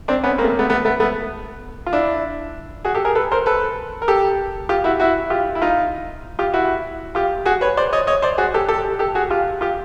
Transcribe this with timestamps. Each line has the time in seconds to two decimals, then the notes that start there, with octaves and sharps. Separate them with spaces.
0.08 C4 D4
0.24 B3 C#4
0.38 A#3 C4
0.44 A3
0.50 A#3
0.59 A3 B3
0.70 A3 B3
0.85 A3 B3
1.00 A3 B3
1.87 F4
1.93 D4 E4
2.85 F#4 G#4
2.95 G4 A4
3.05 G#4 A#4
3.15 A4 B4
3.32 A#4 C5
3.46 A4 B4
4.02 A#4
4.08 G4 A4
4.69 F4 G4
4.84 E4 F#4
5.00 E4 F#4
5.30 F4 G4
5.55 E4
5.62 D#4 F4
6.39 F4 G4
6.53 E4 F#4
7.15 F4 G4
7.46 F#4 G#4
7.61 B4 C#5
7.77 C5 D5
7.93 C#5 D#5
8.07 C#5 D#5
8.22 C5 D5
8.38 F#4 G#4
8.54 G4 A4
8.69 G4 A4
8.99 G4 A4
9.15 F#4 G#4
9.30 F4 G4
9.61 F4 G4